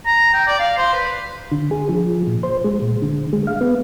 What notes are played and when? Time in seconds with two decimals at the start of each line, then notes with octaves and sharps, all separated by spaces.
0.06 A#5
0.34 G5
0.47 D5
0.59 F5
0.77 C5
0.93 B4
1.52 D3
1.71 G#4
1.89 F3
2.27 A#2
2.43 C5
2.64 G#3
2.82 A#2
3.02 D3
3.33 G#3
3.47 F5
3.61 B3